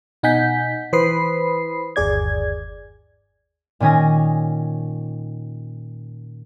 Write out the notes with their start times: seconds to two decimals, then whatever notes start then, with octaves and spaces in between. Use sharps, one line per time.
0.23 B2 D#4 F#5 G#5 G6 B6
0.93 E3 B4 C5 B5 D#6 C7
1.96 G1 D#2 G#4 D5 G#6
3.80 A#2 D#3 C#4 G#5 A#6